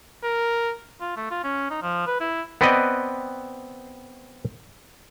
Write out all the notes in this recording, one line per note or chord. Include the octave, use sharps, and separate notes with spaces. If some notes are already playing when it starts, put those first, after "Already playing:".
A#4
F4
A3
F4
C#4
D#4
F3
B4
E4
B3 C4 B4 D5 D#5